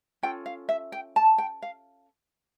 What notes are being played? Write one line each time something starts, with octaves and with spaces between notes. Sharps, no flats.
C#4 F4 A4 G5
F5
E5
G5
A5
G5
F5